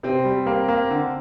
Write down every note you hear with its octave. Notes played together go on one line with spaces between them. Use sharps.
C3 C4
G3
A#3 C4
A#3
D3